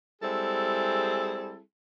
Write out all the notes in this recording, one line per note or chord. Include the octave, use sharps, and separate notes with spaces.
G3 G#3 C4 E4 G#4 A4